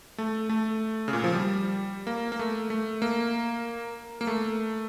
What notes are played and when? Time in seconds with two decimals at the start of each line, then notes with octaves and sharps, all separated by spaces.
0.18 A3
0.49 A3
1.08 C#3
1.13 A#2
1.24 F3
1.34 G3
2.07 A#3
2.32 A#3
2.39 A3
2.70 A3
3.02 A#3
4.21 A#3
4.27 A3